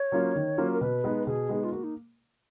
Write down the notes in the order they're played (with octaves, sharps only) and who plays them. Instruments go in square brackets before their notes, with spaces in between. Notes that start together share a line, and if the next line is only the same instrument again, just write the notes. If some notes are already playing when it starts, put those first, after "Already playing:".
Already playing: [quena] C#5
[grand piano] F#3 A#3 C#4 F4
D#3
F#3 A#3 C#4 F4
[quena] A#4
[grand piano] B2 [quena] B4
[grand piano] G#3 B3 D#4
[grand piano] B2 [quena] G#4
[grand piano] G#3 B3 D#4
[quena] F4
[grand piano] A#3 [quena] F#4
[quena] D#4